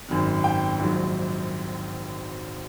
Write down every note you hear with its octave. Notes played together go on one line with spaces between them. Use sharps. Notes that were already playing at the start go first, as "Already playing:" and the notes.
G#1 F#2 D#3
G5
A#1 G#2 D#3 F#3